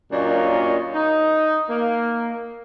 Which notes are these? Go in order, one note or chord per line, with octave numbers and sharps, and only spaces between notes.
F#2 A#2 A#3 D4 C#5 D#5
D#4
A#3